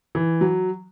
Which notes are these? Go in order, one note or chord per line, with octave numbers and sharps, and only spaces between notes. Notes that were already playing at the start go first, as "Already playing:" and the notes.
E3
F#3